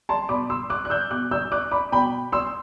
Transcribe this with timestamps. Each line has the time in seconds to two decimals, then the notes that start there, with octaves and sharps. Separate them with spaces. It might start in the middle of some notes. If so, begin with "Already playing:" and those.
0.09 A5 C6
0.29 B2 B5 D6
0.50 C6 E6
0.70 D6 F#6
0.85 F#6
0.90 E6 G6
1.11 B2 D6 F#6
1.31 E6 G6
1.52 D6 F#6
1.71 B5 D6
1.92 B2 G5 B5
2.32 C6 E6